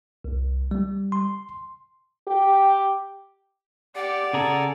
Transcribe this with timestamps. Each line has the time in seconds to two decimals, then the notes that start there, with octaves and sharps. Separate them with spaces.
0.24 C2
0.71 G3
1.12 C6
2.27 G4
3.96 G4 D5 F#5
4.33 C#3 G#4 A4 A#5